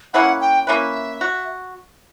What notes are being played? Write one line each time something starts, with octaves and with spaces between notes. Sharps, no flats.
A#3 C#4 E4 B4 F#5
G5
A#3 C#4 E4 B4 E5
F#4